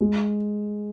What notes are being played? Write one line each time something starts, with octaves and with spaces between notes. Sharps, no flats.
G#3